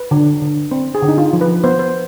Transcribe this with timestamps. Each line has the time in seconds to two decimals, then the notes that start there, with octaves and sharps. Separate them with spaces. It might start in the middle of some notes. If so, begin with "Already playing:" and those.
Already playing: B4
0.11 D3
0.42 D3
0.71 C4
0.95 G#4
1.02 D3
1.08 D#4
1.18 F4
1.33 F3
1.41 B4
1.64 B3 C5
1.79 C5